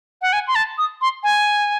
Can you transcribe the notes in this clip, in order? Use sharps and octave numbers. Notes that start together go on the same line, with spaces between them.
F#5
G#5
C6
A5
D#6
C6
G#5